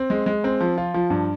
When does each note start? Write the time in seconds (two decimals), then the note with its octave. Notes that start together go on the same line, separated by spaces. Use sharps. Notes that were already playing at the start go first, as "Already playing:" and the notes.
Already playing: C4
0.10 G#3
0.26 G#3
0.44 C4
0.60 F3
0.78 F4
0.94 F3
1.10 G2